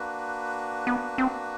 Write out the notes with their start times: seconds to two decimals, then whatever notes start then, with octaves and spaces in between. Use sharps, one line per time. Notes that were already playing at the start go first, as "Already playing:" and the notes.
Already playing: A#3 D4 F#4 B4
0.87 B3
1.18 C4